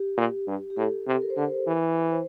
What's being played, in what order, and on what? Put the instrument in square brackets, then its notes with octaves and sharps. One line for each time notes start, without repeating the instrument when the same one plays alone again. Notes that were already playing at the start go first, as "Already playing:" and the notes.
Already playing: [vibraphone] G4
[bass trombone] A#2
G2
[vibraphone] G4
[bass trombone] A2 [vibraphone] A4
[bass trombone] C3
[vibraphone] A#4
C5
[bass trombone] D3 [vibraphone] A#4
[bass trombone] E3
[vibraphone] C5